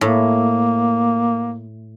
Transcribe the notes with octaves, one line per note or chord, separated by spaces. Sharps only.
A2 A#3